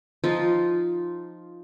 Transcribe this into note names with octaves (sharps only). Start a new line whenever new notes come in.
F3 D#4 F4